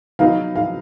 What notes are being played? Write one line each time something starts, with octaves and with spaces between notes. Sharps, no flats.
F#3 B3 D#4 F5
F5